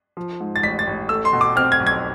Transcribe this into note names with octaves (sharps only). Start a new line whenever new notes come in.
F3
G#2
A6
A1 B6
A6
A1
A3 E6
C6
B2
D6
C4 F6
G#6
B1
G#6